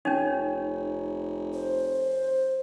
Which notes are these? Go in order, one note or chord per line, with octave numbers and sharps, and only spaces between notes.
F1 C#4 D#4 C#5 G#5
C5